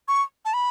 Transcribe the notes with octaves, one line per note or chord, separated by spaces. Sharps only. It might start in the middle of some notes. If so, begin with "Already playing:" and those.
C#6
A5
B5